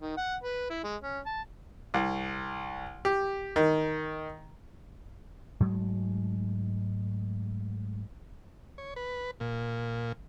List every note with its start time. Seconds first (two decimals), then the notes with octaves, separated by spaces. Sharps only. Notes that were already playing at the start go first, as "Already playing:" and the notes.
0.01 D#3
0.17 F#5
0.44 B4
0.70 E4
0.84 G#3
1.02 C#4
1.26 A5
1.94 C2
3.05 G4
3.56 D#3
5.60 G#2 F#3 G#3 A3
8.78 C#5
8.96 B4
9.40 A#2